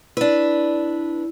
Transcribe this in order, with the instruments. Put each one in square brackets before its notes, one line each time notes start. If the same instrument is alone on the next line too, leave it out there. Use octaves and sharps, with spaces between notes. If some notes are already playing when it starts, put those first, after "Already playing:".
[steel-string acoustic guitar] D4 B4 [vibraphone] E4